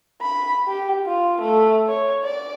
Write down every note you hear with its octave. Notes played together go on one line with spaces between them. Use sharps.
B5
G4
F4
A3
C#5
D5